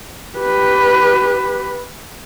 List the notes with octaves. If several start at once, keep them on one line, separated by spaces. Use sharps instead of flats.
G4 B4